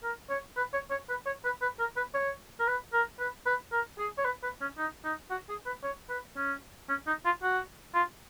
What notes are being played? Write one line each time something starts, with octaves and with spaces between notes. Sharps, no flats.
A#4
C#5
B4
C#5
C#5
B4
C#5
B4
B4
A#4
B4
C#5
A#4
B4
A#4
B4
B4
A#4
G#4
C#5
B4
B4
C#4
D#4
D#4
F#4
G#4
B4
C#5
B4
C#4
C#4
D#4
F4
F#4
F4